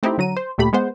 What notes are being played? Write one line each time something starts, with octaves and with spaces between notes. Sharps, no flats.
A3 C4 D#4 E4 G4
D3 F#3 A#5 D#7
C5
D2 A#2 A3 G4 B5
G#3 B3 C5 F#5